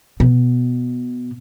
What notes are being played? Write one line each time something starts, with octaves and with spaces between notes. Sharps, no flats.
B2